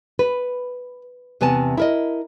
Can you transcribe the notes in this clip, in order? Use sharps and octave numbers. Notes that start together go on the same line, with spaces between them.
B4
E2 C3 B3 G#5 A5
E4 A#4 D#5